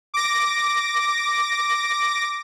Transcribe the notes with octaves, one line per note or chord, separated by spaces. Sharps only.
D6 A#6